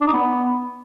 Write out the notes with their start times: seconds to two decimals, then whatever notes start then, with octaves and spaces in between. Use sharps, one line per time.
0.01 D4
0.07 D#4
0.13 B3